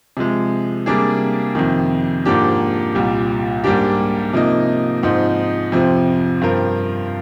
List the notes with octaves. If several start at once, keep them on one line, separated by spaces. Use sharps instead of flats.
C3 F3 G#3
C3 G3 A#3 D4 G#4
F2 C3 D#3
G#2 F3 A#3 D4 G4
C2 A#2 G3
G#2 G3 A#3 D4 G4
C3 F3 A#3 D#4
G#2 F3 C4 D#4
F2 C3 F3 C4
G2 F3 C4 F4 A#4